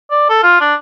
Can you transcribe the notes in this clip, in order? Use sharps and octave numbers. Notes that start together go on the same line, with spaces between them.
D5
A4
F4
D4